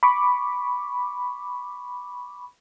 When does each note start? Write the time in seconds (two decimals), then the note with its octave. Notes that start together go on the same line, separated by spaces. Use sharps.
0.03 B5 C#6 D6